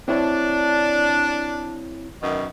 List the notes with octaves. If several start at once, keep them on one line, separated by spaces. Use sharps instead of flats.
C4 D4 E4 C#5
F#2 B2 D#3